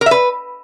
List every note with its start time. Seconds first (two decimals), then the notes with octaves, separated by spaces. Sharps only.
0.01 A#4
0.06 E5
0.11 B4